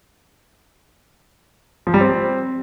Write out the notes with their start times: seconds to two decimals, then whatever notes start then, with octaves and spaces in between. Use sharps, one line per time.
1.87 F3
1.94 G3
2.01 C4